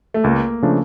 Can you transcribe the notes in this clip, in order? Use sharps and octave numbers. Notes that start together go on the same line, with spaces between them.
A3
C#2 A#3
C#3 F3 A3 D4